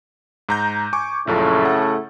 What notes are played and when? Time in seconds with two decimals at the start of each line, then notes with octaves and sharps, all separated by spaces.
0.49 G#2 A#5 G6
0.93 G#5 C#6 D6
1.27 A#1 F#2 A2 C#3 A3 F4
1.65 F#5